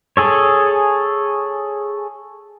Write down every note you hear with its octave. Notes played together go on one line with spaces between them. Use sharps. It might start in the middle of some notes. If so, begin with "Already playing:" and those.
G#4 A4 C#5